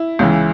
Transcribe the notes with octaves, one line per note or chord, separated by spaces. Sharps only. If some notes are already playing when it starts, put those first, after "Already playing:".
Already playing: E4
C#2 C#3 E3